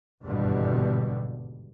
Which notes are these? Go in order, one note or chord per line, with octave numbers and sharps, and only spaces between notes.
G#1 E2 G2 B2 D3 G3